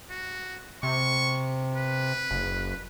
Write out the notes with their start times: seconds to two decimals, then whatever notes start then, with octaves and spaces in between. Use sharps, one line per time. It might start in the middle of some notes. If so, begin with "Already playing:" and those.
0.10 F#4
0.83 C3 C#6
1.76 B4
2.31 F#1